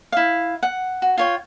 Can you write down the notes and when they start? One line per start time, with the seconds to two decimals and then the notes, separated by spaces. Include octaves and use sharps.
0.12 E4 F5
0.63 F#5
1.02 F#4
1.18 F4 C#5 G5